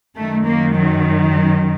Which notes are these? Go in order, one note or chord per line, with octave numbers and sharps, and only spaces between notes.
F#2 D#3 A3
A#3
F#3
F#3